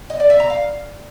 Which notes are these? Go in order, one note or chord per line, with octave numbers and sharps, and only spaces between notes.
D#5
D5
E5
A#5
F5